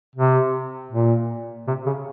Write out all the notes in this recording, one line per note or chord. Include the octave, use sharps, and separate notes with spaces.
C3
A#2
C3
C#3